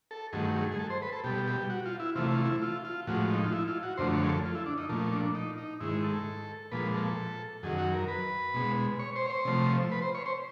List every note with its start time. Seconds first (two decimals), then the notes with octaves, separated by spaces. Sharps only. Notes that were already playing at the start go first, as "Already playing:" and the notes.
0.11 A4
0.33 G2 D#3 F#3 A3 G#4
0.55 G#4
0.72 G#4
0.79 A4
0.90 C5
1.02 B4
1.12 A4
1.24 B2 G3 G4
1.47 G4
1.70 F#4
1.86 F4
2.00 E4
2.15 C3 E3 A3 F4
2.31 F4
2.45 E4
2.62 F4
2.85 F4
3.07 A2 F3 G#3 F#4
3.30 D#4
3.44 F4
3.53 E4
3.68 F4
3.83 F#4
3.97 F#2 D3 F3 A3 C5
4.13 C#5
4.23 G#4
4.29 A4
4.45 F4
4.55 E4
4.66 D4
4.78 D#4
4.89 A#2 F3 A3
5.12 D4
5.35 D#4
5.58 D#4
5.81 G#2 D#3 G#3 E4
6.04 A4
6.72 A#2 F3 G#3 B4
6.94 A4
7.63 F#2 D#3 F#3 G#4
7.78 F#4
7.94 A#4
8.08 B4
8.54 B2 G#3
8.99 C#5
9.16 C5
9.26 C#5
9.30 C5
9.45 C3 F3 A3
9.92 B4
10.02 C5
10.15 C#5
10.26 C5